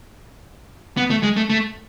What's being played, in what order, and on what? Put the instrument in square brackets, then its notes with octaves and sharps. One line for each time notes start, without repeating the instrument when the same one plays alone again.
[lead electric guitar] B3
A3
G#3
A3
A3